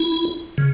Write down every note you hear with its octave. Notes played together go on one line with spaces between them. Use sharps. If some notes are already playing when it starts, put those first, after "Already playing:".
Already playing: E4
C#3